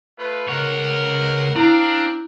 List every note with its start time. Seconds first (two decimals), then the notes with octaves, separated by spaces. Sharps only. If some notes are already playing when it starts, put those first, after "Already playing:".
0.18 A3 F4 B4
0.48 C#2 A#4 C#5 F#5
1.56 C4 D4 E4 F5 A#5